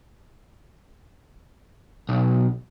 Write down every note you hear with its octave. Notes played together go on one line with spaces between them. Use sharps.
B1